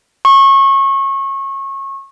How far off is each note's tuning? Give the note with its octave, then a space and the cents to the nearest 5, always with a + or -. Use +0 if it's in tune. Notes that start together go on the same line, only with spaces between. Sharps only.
C#6 -25